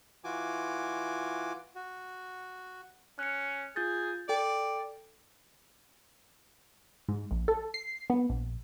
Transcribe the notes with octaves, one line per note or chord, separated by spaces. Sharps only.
E3 F4 F#4 G#5 D6
F#4
C#4 F#6 C#7
F4 G#4 G6 A6
A4 D5 G5
G#2
A#1
A4
C7
B3
A#1